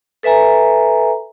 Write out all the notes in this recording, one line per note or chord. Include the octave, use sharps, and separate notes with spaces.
A4 B4 E5 G#5 A#5